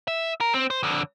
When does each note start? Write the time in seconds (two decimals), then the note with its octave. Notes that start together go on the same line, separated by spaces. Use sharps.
0.08 E5
0.41 A#4
0.54 C4
0.70 C5
0.83 F2 D3